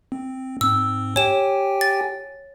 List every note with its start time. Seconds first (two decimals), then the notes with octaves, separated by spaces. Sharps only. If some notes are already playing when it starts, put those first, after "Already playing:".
0.12 C4
0.61 G#2 C4 E6
1.16 G4 C#5 G5 G#5 E7
1.81 A6